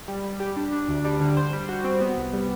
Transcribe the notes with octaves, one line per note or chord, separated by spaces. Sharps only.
G3
G3
G4
D4
D4
D2
G3
D3
C5
G3
F#4
C4
B3
C2
G3